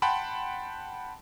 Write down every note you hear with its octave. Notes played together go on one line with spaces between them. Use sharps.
F#5 G5 A5 B5 C6